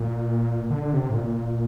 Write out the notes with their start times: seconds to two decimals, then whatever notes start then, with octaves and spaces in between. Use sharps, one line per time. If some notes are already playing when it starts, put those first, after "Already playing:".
Already playing: A#2
0.70 D3
0.93 C3
1.09 A2
1.15 A#2